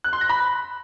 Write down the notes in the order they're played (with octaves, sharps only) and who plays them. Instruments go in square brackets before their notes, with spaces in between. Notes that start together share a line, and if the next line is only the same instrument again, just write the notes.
[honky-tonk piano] F#6
C6
A#6
B5